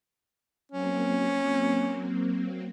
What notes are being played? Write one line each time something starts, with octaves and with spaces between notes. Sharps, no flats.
F#3 A#3 C4 C#4